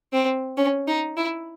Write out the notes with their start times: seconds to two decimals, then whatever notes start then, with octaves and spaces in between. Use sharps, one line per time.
0.13 C4
0.58 C#4
0.88 D#4
1.17 E4